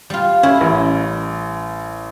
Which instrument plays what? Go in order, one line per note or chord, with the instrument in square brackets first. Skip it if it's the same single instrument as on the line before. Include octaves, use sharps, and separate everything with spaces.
[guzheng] G3 F4
[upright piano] C#4 [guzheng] E4
[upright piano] A1